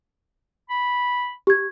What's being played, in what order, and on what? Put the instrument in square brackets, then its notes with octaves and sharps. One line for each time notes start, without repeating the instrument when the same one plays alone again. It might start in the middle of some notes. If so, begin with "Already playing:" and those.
[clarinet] B5
[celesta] G4 G#6